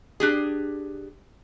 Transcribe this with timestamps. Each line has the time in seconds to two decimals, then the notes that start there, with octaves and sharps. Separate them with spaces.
0.20 D4 G4 G#4